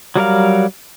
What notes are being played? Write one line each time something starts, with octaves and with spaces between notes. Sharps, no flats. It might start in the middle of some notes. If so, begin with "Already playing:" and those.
F#3 G3 A#4 F5